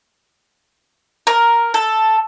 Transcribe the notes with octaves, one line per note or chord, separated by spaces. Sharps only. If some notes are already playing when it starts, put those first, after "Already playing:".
A#4
A4